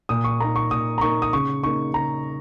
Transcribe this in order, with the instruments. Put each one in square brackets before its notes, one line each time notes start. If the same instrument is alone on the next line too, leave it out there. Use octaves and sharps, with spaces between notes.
[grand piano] A#2 D#6
C#6
A#3 D#4 A#5
C#6
A#2 D#6
A#5
A#3 D#4 C#6
D#6
C#3 C#6
A#3 D#4 C#6
C#3 A#5